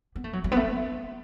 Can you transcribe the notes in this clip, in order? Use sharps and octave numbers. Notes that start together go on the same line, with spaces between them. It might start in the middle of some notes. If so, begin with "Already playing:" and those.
B3
A3
F#3
F#3
B3
A3